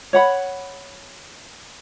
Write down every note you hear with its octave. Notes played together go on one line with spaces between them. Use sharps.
C#5 F#5 B5